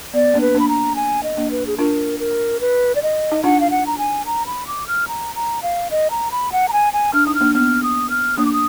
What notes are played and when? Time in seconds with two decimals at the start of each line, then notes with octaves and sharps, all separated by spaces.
0.14 B3 D5
0.34 A#3 D4
0.41 B4
0.55 A#3 D4
0.60 B5
0.69 A#5
0.96 G#5
1.23 D#5
1.37 A#3 D4
1.51 B4
1.67 G#4
1.78 D4 F4 A#4
2.20 A#4
2.61 B4
2.95 D5
3.03 D#5
3.32 D#4
3.44 D4 F4 F#5
3.60 F5
3.71 F#5
3.86 A#5
3.98 G#5
4.26 A#5
4.46 B5
4.67 D6
4.87 F6
5.08 A#5
5.35 A#5
5.62 F5
5.91 D#5
6.11 A#5
6.32 B5
6.52 F#5
6.68 A#5
6.73 G#5
6.93 G#5
7.13 D4 F6
7.27 D#4 D#6
7.35 F6
7.41 A#3 D4
7.55 B3 F6
7.83 D#6
8.10 F6
8.37 A#3 D4 D#6
8.46 D6
8.53 D#6